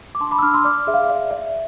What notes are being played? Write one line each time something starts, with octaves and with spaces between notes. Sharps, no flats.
D6
D4 A5 C6
B5 D6
E6
D4 D6 F6
C6 E6
D5 D6 F6
G#4 E5
F5
D5 E5
D5 E5